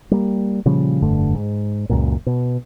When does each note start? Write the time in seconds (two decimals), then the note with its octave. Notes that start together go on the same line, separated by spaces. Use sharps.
0.11 G3 A#3
0.65 A#2 C#3 F3 G3
1.02 F1 G2 D3 A3
1.34 G#2
1.89 C#2 F#2 A#2
2.26 B2